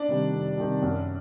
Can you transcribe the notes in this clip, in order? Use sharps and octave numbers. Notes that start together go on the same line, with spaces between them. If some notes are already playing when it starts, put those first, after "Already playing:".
Already playing: D4 D5
C3 D#3 G3
F2
C3 D#3 G3
F#2